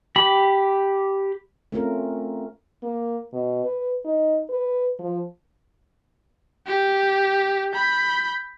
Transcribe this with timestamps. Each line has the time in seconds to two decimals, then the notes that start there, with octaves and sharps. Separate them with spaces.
0.16 G4 B5
1.72 A3 C4 C#4 F4 A#4
2.83 A#3
3.33 B2
3.65 B4
4.04 D#4
4.50 B4
4.99 F3
6.67 G4
7.74 B5 G6